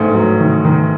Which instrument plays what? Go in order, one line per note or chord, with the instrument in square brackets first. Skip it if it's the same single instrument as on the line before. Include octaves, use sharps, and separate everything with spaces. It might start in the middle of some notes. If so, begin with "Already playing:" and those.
Already playing: [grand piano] A1 G#2 A3
F#3
D#3
D#3